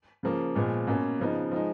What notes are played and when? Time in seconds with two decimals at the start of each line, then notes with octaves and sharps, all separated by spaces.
0.23 C#3 F3 A#3
0.55 A#2 F3 G#3 B3
0.87 B2 A#3 C#4
1.20 C#3 F3 B3 D#4
1.52 F3 G#3 D#4